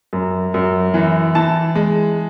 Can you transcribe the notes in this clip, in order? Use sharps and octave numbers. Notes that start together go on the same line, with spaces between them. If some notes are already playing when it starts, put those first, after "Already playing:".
F#2
F#2
E3
E3 A5
G#3